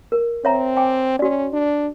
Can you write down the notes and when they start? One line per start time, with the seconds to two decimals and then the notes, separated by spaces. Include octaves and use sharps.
0.12 A#4
0.45 C4 C#5 E5 A#5
0.77 G5 G#5 D6
1.19 C#4 F#4 D5
1.53 D4